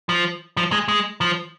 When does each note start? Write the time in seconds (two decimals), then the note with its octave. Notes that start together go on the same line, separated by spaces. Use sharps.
0.09 F3
0.57 F3
0.72 G#3
0.88 G#3
1.21 F3